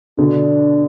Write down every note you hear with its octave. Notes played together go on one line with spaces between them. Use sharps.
B2 D3 D4